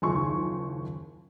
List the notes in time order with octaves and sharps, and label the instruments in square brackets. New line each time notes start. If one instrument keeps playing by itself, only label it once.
[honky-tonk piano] F#1 D#2 F3 G#5 C6 C#6